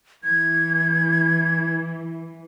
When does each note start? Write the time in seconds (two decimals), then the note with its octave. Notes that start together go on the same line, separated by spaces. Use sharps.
0.24 E3 G#6